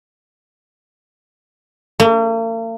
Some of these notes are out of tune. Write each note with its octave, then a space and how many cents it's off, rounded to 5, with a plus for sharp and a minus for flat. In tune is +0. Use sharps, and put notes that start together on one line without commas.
A#3 -45